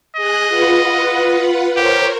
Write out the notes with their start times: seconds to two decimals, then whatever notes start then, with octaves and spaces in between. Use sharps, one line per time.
0.17 G#4 D#5 F#6
0.49 F4 B4 F#5
1.77 G4 A#4 C5 C#5